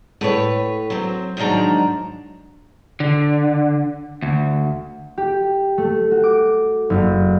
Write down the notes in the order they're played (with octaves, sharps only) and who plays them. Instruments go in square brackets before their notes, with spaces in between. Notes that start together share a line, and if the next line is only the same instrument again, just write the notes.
[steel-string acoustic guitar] A2 B4 C#5
F#3 C4
G#2 D#3 F3 F#3 D4 A#5
[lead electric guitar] D3
D2
[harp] G4
A3
F#4
D6
F#1